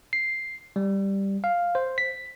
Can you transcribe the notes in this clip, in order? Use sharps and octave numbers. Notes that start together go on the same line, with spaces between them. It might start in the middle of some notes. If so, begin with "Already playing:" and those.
C7
G3
F5
C5
B6